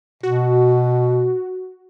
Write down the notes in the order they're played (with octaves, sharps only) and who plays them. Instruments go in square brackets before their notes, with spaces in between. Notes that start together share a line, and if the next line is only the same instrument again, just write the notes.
[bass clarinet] B2 [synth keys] F#4